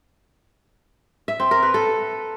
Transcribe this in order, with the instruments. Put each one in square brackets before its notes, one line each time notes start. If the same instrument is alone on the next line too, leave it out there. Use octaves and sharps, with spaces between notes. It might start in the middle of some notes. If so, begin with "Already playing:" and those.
[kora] E5
C4
A#4
B4
A4